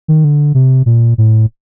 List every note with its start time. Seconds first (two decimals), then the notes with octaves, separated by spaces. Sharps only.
0.08 D#3
0.24 D3
0.54 C3
0.86 A#2
1.18 A2